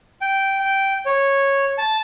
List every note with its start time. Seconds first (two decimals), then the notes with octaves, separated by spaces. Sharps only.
0.21 G5
0.60 G5
1.06 C#5
1.78 A5